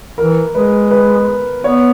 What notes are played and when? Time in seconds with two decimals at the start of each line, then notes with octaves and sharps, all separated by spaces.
0.18 E3 A#4
0.55 G#3 B4
0.91 B4
1.64 B3 C#5